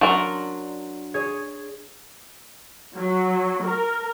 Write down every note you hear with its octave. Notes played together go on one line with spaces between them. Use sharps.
F#3 D4 A#4 A5 C6
G#4 C#5
F#3
A#4